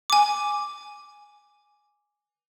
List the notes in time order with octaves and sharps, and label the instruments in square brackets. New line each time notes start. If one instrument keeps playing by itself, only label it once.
[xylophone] G#5 D6